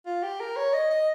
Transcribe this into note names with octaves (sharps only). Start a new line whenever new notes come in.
F4
G4
A#4
C#5
D#5
D#5